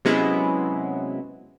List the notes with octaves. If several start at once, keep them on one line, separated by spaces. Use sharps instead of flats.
C3 F#3 G#3 B3 C#4 E4